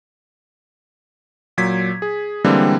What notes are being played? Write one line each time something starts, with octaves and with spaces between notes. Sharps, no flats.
A#2 F#3 G#6 B6
G#4
D3 E3 G3 G#3 A#3 C4